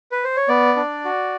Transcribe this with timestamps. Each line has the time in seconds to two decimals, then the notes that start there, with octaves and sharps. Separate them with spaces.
0.12 B4
0.24 C5
0.37 C#5
0.48 B3 D5
0.76 D4
1.05 F#4